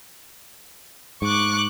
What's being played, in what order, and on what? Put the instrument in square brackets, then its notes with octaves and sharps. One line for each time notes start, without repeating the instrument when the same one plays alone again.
[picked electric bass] G#2 [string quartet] C#6 D6 F#6